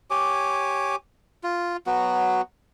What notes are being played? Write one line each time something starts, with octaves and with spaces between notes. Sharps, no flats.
G4 C#5 G#5 D6
F4
F#3 B3 F#4